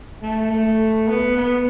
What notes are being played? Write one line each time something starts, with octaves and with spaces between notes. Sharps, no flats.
A3
A3
B3
B3